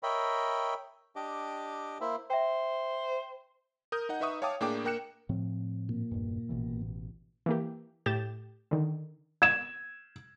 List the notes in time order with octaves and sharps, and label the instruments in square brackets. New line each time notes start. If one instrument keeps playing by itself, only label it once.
[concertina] A#4 C#5 D#5 E5 G5 B5
D4 G4 D#5 D6
A#3 E4 C5 E5
[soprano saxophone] C5 [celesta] E5 G5
[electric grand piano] A#4 D#6 G6
D#4 D#5 F#5
D#4 B4 E5 C#6 D#6
C#5 F5 G5 A5 D6 D#6
A2 A#3 D4 G#4 G5 D6
A#3 A#4 G5 F#6 C#7 E7
[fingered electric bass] A2 F3 C4
[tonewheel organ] A#2
[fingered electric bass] E1 G2
A1 B2 E3
[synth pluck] E3 A#3 G4
A2 G4 G6 A6 E7
D3 D#3
[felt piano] G#6 E7